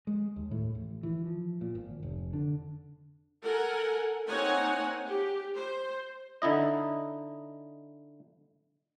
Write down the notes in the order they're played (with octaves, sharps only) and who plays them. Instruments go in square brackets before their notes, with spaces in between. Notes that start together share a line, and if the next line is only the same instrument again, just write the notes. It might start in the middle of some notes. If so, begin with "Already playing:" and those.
[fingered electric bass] G#3
D#2
A2
A1
E3
F3
A#2
G#1
F1
D3
[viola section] A4 A#4 F#5 G#5
A#3 C4 D#4 C#5 F#5 G#5
G4
C5
[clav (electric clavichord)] D3 D#4 E4 D#5